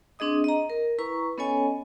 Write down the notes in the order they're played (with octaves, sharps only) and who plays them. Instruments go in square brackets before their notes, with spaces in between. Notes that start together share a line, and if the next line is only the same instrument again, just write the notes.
[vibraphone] C4 D4 G#4 D#5 D#6
D#5 A#5
A#4
E4 B4 A#5 C#6
B3 C#4 A4 C#5 D#5 G#5